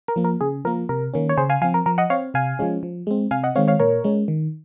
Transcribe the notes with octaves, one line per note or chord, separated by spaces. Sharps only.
A#4
F3 A#3
A#4
C#3 G#4
F3 A#3 A#4
C3 A#4
D#3 A#3 C#4
C#5
C#3 G#4 C5
F5 G#5
F3 C4 F5 G#5
A#4
F3 A#4
D#5 F#5
C4 C#5 F5
C3 F5 G#5
F3 G#3 C#4
F3
G#3 C4
C3 F5 G#5
D#5 F#5
D#3 G#3 C4 C#5 F5
C#5 F5
A#2 A#4 C#5
G#3 C#4
D#3